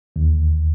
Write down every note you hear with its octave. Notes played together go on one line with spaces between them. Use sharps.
D#2